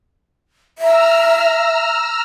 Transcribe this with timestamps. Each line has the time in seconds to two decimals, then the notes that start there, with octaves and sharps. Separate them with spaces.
0.79 E5 A#5 E6 F6